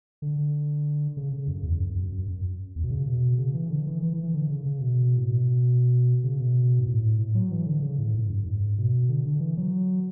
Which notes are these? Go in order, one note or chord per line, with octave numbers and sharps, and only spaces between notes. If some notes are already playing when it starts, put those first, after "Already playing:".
D3
C#3
C#3
F#2
E2
F#2
F#2
F#2
F#2
E2
B2
C#3
B2
C#3
E3
D3
E3
E3
E3
E3
D3
C#3
C#3
B2
A2
B2
C#3
B2
G#2
A2
A2
F#3
E3
D3
C#3
A2
G#2
F#2
G#2
B2
D3
D3
E3
F#3